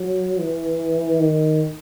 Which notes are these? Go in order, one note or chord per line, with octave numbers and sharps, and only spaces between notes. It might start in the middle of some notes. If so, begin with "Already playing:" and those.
Already playing: F#3
E3
D#3